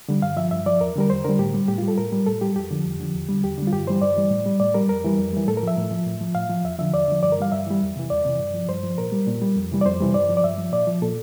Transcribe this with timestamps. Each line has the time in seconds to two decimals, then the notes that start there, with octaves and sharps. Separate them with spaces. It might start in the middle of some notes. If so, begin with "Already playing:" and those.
0.09 D3 G3
0.22 G2 F5
0.36 F3 E5
0.51 G2 E5
0.66 F3 D5
0.80 E2 A#4
0.95 D3 G3 A#4
1.10 E2 C5
1.25 D3 G3 A#4
1.39 A2 G4
1.54 G3
1.68 A2 G4
1.78 G3 F4
1.88 A4
1.98 A2 A#4
2.12 G3
2.26 A2 A4
2.41 G3 G4
2.55 F2 G4
2.71 D3 F3
2.85 F2
3.00 D3 F3
3.15 E2
3.29 D3 G3
3.43 E2 G4
3.58 D3 G3
3.67 F4
3.73 G2 G4
3.87 E3 G3 C5
4.02 G2 D5
4.17 E3 G3
4.30 A2
4.46 G3
4.60 A2 D5
4.74 G3 A#4
4.89 F2 A#4
5.05 E3 G3
5.18 F2
5.33 E3 G3
5.48 A2 A4
5.57 A#4
5.63 F3 E5
5.77 A2
5.91 F3
6.06 A2
6.21 F3
6.35 A2 F5
6.50 F3
6.64 E2 E5
6.78 D3 F3 E5
6.93 E2 D5
7.08 D3 F3
7.23 G2 D5
7.32 A#4
7.38 E3 G3 F5
7.52 G2 E5
7.67 E3 G3
7.81 E2
7.96 C3 E3
8.10 E2 D5
8.25 C3 E3
8.39 G2
8.54 F3
8.68 G2 C5
8.83 F3
8.98 A#2 A#4
9.12 G3
9.27 A#2
9.42 G3
9.56 F2
9.71 C3 E3 G3
9.81 D5
9.86 F2 C5
10.00 C3 E3 G3
10.14 G2 D5
10.29 F3
10.37 D5
10.44 G2 E5
10.58 F3
10.72 A#2 D5
10.87 F3
11.02 A#2 A4